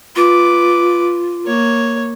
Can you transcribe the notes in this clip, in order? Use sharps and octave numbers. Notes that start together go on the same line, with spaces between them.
F4 B4 D6
A#3 C#5